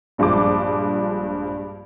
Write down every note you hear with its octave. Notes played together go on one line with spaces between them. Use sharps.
A#1 G2 F3 G#3 D6